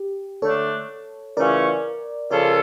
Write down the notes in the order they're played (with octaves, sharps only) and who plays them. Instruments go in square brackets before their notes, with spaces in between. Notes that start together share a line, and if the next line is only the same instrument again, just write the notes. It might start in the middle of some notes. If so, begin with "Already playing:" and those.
Already playing: [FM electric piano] G4
[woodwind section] D3 A3 D4 [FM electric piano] A4 C#5
[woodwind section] C#3 E3 A3 C#4 F4 [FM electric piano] A#4 D5
[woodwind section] C#3 F3 C#4 F4 A4 [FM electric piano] A#4 D5